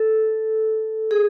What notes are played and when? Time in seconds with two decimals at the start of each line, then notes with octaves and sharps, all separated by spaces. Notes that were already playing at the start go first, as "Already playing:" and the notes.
Already playing: A4
1.11 G#4